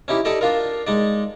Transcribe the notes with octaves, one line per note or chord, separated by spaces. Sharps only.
C#4 D#4 E4 G4
D#4 G4 A4 D5 D#5
D4 F4 A#4
G#3 D#4 D5